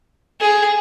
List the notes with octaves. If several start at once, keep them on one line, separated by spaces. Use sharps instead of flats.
G#4